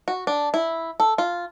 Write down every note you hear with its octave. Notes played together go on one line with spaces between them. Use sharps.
F#4
D4
E4
A4
F4